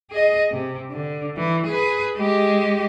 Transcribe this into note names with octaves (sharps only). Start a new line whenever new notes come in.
G#4 D#5
C3
D3
E3
G#4 B4
G#3 G4